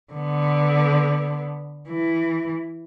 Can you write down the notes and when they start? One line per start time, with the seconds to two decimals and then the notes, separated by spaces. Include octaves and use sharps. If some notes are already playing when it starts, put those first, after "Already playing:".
0.13 D3 B3
1.89 E3